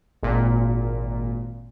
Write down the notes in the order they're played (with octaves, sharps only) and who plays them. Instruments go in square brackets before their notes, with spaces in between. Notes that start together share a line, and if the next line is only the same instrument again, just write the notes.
[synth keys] G#1 A#2